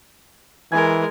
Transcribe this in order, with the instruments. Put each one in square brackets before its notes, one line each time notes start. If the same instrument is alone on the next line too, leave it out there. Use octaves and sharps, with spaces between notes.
[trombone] E3 [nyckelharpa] G#3 A#4 [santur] G#5